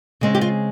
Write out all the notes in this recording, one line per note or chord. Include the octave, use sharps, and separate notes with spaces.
C#3 G#3 C4
G4
F4